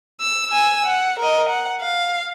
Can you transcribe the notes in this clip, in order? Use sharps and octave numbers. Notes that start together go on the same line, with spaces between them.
E6
G#5 E6
F#5
A#4 D#5
F#5
F5